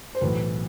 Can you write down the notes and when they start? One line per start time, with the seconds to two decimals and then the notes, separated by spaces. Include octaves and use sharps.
0.15 C5
0.21 B1 A2 E3 B4